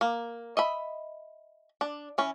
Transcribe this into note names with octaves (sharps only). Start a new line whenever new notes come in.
A#3
D#5 E5 B5
D4
E3 C#4